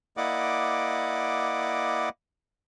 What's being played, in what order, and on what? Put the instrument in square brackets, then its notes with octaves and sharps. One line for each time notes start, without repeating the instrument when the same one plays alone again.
[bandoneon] A#3 E4 D5 D#5 F#5 D6